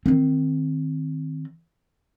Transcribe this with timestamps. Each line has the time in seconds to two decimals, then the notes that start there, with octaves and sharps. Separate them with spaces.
0.06 D#3 C4